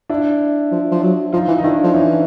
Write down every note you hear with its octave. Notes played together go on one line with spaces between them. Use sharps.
D4 E4
F3
F3
F#3
F3 D#4 F4
E3
D#4
D#3 D4 E4
F3
E3 C#4 D#4